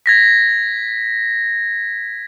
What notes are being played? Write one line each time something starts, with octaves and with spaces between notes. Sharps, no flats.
G#6 A#6 B6